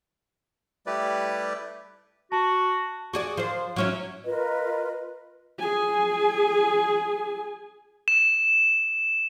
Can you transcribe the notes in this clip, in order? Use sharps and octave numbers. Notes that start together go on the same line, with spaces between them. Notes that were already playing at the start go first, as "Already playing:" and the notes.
G3 A3 E4 G4 B4 D5
F#4 A5
F#4 G#4 D5
F3 C5
F#3 C#4 E4
F4 A#4 B4 D#5
G#4 G#5
E7